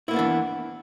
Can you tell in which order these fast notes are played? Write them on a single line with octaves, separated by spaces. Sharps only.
E4 A#3 B3 D4 E3